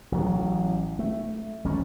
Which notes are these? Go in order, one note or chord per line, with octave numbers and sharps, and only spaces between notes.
A1 F#3
A3
A#1 A#2 C#4